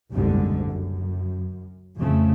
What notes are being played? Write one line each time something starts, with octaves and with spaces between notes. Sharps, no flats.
F#1 C2 G#2 B2 D3 G3
F#2
F2 C#3 A3